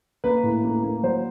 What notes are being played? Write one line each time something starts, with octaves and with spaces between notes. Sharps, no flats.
A#3 B4
A2
A#3
A#3
F#3 C5